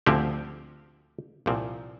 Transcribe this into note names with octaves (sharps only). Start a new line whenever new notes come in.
D2 D3 F3 C4 G4
C2 A#2 F3 C4